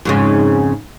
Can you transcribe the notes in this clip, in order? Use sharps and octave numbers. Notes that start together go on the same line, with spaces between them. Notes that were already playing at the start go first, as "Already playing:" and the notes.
F2 G#2 C#3